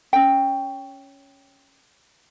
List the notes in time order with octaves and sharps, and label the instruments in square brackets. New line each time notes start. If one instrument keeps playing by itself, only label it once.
[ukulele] C#4 G5